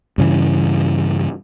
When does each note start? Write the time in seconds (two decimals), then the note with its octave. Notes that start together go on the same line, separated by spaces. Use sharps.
0.18 G2 C#3 E3